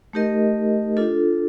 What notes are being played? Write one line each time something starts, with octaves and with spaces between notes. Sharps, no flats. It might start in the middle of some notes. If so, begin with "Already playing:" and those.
A3 D#4 G4 A#4 D#5
D4 F4 A4